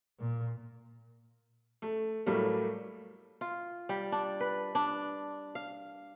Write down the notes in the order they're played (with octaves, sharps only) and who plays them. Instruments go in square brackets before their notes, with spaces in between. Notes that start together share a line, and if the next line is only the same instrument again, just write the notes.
[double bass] A#2
[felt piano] A3
A2 F#3 G3 A3 A#3
[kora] F4
G3
D4
B4
D4
F5